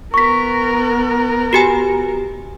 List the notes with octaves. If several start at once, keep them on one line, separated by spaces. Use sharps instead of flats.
B3 A#4 C#6 B6
F#4 G4 G#5